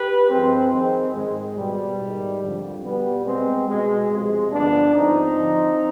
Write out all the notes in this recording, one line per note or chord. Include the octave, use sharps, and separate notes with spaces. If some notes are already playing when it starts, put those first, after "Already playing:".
Already playing: G4 B4
G2 F3 G#3 C4
F2 D#3 G#3 C4
G#2 D#3 G#3
B2 G3
G#2 D#3
F2 D3 F3
B2 G3 B3
B2 G#3 C4
B2 G#3
F2 C3 F3 G#3
G2 D3 F3 B3 D4
G#2 F3 C4 D#4
F2 D3 F3